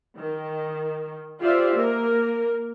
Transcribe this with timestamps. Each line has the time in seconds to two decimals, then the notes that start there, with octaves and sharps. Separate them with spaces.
0.17 D#3
1.41 F4 G4 C5 D5 E5 F5
1.76 A#3 A#4